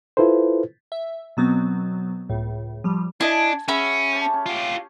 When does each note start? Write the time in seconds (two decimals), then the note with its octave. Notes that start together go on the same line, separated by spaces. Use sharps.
0.17 E4 F4 A4 B4 C5
0.92 E5
1.37 B2 F#3 B3 C4
2.29 C#2 A2
2.84 F3 G3
3.21 D4 E4 D#5 G#5 A5
3.68 C#4 F#4 G#4 E5 B5
4.13 G4 C#5 A5
4.34 C#4
4.46 F4 G4